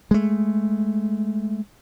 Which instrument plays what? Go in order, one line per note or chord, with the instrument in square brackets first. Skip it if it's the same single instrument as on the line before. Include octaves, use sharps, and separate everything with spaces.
[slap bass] G#3 A3